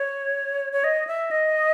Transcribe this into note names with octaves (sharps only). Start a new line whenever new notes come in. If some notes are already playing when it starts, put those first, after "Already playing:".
Already playing: C#5
C#5
D#5
E5
D#5